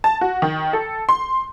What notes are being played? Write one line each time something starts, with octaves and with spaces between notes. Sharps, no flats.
A5
F#4
D#3
A4
C6